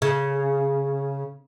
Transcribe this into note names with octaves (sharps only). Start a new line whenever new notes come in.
C#3